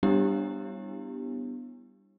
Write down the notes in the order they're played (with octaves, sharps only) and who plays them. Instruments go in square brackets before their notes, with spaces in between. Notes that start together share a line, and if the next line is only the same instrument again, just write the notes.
[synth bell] G3 B3 D4 E4 G4